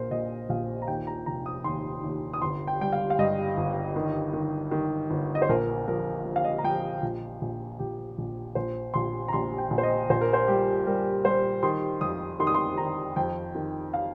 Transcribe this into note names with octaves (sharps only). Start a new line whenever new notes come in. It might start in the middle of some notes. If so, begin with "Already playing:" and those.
Already playing: A#1 A#2 A#4 C5
A#2 D#5
A#1 F5
A#5
D#2 G5
A#5
F1 A#5
D#6
D#2 C6
D#2
D#6
G1 C6
G5
G3 G5
F5
F5
G2 D#5
G1
D#3
D#3
D#3
G1
D#5
C5
A#1 A#4
F3 A#4
F3
F5
D#5
A#5
F3 G5
A#1
A#1
A#1 G4
A#1
A#1 C5
A#1 C6
A#5
A#1 C6
G5
A#1
C5
D#5
A#1 C5
A#4
C5
G3 G4
G3 A#4
G3 C5
D#3 C6
F2 D#6
D#3 C6
D#6
C6
D#3 A#5
F2 G5
D#3
F5